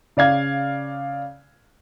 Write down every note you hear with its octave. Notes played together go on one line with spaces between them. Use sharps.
C#3 D5 F5 G#6